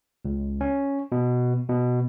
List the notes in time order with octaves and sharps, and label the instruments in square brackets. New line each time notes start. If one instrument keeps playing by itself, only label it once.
[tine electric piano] C#2
C#4
B2
B2